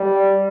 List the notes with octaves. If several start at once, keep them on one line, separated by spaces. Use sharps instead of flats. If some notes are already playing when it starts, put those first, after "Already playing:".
Already playing: G3